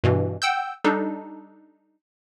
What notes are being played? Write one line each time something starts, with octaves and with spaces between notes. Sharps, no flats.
G2 B2 E3
F#5 G5 E6 G6
G3 D4 D#4 A4